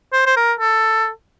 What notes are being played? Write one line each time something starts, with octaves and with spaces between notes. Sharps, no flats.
C5
C5
A#4
A4